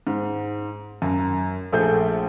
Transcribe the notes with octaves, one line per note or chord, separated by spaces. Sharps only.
G#2
F#2 A#5
A#1 A3 G#4 A4 G6